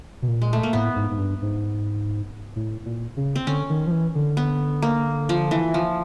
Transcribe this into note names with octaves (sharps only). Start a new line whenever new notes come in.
B2
A#2
G#3
A3
A#3
A2 B3
G#2
G#2
G2
G#2
A2
A#2
C#3
C4
D3 C#4
D#3
F3
E3
D3
B3
A#3
F3
E3
F3